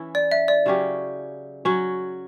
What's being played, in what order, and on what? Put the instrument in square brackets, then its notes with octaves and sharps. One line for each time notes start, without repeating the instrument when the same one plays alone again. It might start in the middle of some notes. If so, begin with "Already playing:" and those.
Already playing: [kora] E3 C#4 E4
[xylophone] D5
E5
D5
[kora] C#3 F#3 C#4 G4
F#3 C#4 F#4